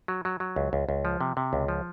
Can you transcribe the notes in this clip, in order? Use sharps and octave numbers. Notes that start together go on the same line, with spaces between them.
F#3
F#3
F#3
C#2
C#2
C#2
F3
C3
C3
C#2
F3